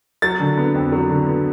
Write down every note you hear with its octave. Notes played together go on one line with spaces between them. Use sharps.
F#3 A6
D3
B3
F2
F#3
D3
B3